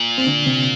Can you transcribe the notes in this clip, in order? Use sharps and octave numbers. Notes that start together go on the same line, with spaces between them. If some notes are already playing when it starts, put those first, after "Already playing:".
Already playing: A#2
C4
D3 D4
C3 C4